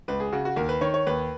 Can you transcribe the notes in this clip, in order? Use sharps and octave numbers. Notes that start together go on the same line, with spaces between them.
C#2 B4
G#4
C#3 F#4
F#4
D#2 A#4
B4
D#3 C#5
C#5
D#2 B4